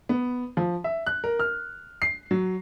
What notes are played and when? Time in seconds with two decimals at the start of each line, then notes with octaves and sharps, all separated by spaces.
0.09 B3
0.57 F3
0.84 E5
1.06 F#6
1.24 A#4
1.40 F6
2.02 C7
2.31 F#3